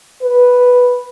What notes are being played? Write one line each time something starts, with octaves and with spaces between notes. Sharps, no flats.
B4